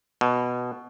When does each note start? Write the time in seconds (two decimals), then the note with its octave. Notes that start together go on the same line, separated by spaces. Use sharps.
0.21 B2